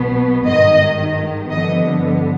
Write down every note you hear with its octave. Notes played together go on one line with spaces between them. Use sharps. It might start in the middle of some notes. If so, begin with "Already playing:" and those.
Already playing: B1 B2 B3
G#1 G2 D#3 D#5
G2 D3 F3 B3 D#5